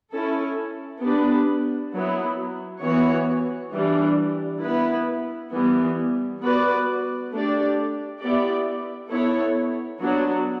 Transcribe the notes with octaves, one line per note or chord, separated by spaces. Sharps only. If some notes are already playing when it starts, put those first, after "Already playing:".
C#4 E4 A4
B3 D4 G4 B4
F#3 B3 E4
E3 B3 F#4 C#5
E3 G3 D4
B3 E4 B4
E3 G3 B3
B3 F#4 B4 D5
A3 D4 G4 D5
B3 E4 G4 D5
B3 E4 A4 C#5
F#3 B3 D4 F#4